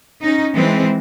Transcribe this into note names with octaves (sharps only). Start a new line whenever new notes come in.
C#4 D#4
E3 G#3 C4